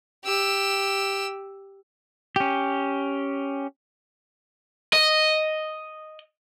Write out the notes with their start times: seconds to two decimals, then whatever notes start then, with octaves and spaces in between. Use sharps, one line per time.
0.25 G4 E6
2.36 C#4 G4
4.93 D#5